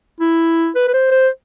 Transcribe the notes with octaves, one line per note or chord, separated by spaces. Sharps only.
E4
B4
B4
C5
C5